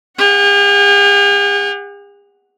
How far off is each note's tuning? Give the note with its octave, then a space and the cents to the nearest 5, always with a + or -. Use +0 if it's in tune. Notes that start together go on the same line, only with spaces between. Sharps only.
G#4 -45 F#5 +0